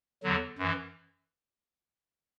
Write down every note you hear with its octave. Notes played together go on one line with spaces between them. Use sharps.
E2 D3 F#3
F#2 E3